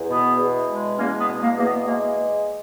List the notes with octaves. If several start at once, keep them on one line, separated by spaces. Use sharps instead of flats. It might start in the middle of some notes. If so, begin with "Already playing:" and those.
Already playing: E2
B2 B3
E2
G#3
E2 A#3 C#4
B3
B2
A#3
E2 A#3
B3
G#3 A#3